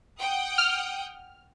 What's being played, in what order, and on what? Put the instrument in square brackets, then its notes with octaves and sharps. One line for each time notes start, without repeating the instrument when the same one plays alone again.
[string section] F#5 G5 D#6
[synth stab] F6